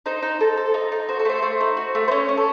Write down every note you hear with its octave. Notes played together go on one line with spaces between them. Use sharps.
D#4 C5
D#4
A4
A4
D#4
D#4
F#4 C5
A4
A3 C5
A3
D#4
F#4
A3
C5
C#4 C#5
C#4
A4